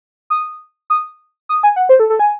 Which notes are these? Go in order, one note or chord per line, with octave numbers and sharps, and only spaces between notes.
D#6
D#6
D#6
G#5
F#5
C5
A4
A4
G#5